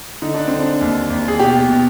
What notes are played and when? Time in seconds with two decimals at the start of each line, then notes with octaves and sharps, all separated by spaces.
0.22 D3 D#4
0.34 D4
0.47 D3 C4
0.60 D4
0.81 D#2
1.10 D#2
1.28 G#4
1.39 B2 G4
1.69 B2